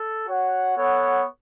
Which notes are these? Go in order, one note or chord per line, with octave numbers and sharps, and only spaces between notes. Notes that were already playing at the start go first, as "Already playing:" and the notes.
Already playing: A4
F#4 C#5 F#5
B3 A4 C#5 F#5